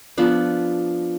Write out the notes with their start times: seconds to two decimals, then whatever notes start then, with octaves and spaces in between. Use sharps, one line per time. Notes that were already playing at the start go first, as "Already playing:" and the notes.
0.18 F3 B3 D4